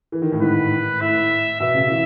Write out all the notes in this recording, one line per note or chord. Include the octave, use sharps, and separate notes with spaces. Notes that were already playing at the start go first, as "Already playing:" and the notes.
E3
D#3
A2
G#2 B4
A2 E5
B2 E5
C#3
E3